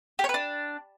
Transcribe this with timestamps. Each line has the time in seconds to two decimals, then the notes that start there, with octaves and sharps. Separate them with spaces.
0.19 G4
0.24 C#5
0.29 B4
0.34 D4